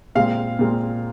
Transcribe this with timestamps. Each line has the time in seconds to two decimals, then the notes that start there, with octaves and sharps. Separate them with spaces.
0.15 A#2 G#3 C4 F5
0.59 A#2 G#3 C4